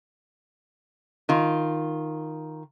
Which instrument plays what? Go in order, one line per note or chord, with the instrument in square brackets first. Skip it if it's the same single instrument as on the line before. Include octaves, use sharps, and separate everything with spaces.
[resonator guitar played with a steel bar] D#3 F4